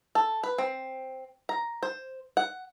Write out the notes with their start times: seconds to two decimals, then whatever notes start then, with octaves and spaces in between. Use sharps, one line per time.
0.15 A4
0.43 B4
0.58 C4
1.49 A#5
1.83 C5
2.37 F#5